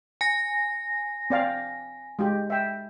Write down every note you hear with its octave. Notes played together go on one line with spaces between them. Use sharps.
G#5 A#6
C4 D5 F5
G#3 G4
E5 G5